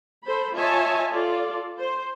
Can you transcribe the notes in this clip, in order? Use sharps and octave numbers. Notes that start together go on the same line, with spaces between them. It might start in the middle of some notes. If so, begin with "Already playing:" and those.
A4 C5 B5
F4 C#5 D#5 E5 G#5 A5
F4 A4 D5
C5